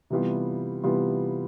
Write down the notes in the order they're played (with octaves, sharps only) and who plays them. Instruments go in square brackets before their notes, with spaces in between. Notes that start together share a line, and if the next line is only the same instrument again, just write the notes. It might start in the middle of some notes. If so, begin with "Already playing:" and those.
[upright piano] C3 E3 G3 B3 F4
C3 E3 G3 B3 F4